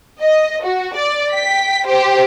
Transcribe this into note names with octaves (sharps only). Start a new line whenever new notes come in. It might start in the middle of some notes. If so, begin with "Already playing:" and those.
D#5
F#4
D5
G5 B6
G4 C5